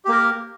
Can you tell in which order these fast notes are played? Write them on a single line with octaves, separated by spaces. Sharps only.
G4 A#3 A#4